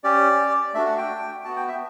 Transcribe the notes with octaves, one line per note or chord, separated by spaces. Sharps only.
C#4 G4 D5
A3 D4 F#4 E5
F#5
G5
B3 F#4 A5
G5
E5